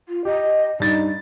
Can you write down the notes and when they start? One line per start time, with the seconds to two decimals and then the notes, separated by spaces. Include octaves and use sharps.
0.09 F4
0.25 G4 D#5
0.80 G2 D#4 A6